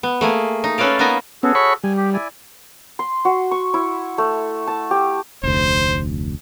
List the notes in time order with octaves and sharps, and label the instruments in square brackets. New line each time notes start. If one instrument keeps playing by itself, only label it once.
[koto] B3
A3 A#3 G#4
D#4
C#4 A4 B4 C#5 D5 F5
A#3 B3 D#4 B4 G#5 A#5
[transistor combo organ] B3 C#4 [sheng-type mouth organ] F#4 G#4 A4
[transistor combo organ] C#5 B5 C#6
[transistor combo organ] G3 [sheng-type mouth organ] G#5
[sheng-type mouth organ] G4
E4 D5 G#5
[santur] C6
F#4
C#6
E4
A3
A5
G4
[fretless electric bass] F1 D2 [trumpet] C5